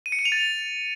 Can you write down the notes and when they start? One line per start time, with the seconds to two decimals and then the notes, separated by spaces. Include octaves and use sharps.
0.06 D#7
0.12 C#7
0.19 D#7
0.25 F7
0.32 A6